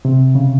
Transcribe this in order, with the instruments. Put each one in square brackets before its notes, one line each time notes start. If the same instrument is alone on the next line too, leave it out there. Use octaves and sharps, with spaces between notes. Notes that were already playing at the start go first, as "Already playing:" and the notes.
[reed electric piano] C3
C#3